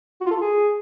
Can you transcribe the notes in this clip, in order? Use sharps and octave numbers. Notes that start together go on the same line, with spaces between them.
F#4
F4
A4
F4
G#4